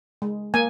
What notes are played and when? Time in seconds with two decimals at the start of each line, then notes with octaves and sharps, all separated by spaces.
0.22 G#3
0.54 A#3 G#5